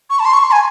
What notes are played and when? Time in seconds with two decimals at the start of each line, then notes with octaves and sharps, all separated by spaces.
0.10 C#6
0.19 A5
0.25 C6
0.34 C#6
0.43 C6
0.52 G#5